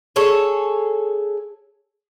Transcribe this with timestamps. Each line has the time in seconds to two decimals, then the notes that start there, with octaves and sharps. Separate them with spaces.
0.16 G#4 A4 C#5